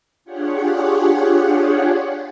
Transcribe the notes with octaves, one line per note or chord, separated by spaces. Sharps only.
D4 F4 G4 G#4 C#5 F#5